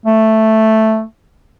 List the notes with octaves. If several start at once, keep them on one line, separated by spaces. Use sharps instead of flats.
A3